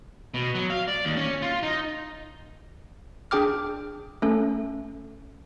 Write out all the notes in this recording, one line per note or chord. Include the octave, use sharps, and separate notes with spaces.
B2
F#3
F5
D5
D#2
C#4
F4
D#4
D4 G#4 G5 D6 F6
A3 C#4 A4